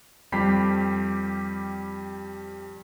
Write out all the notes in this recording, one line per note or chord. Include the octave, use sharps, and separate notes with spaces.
F2 G3 G4 B5 B6 C7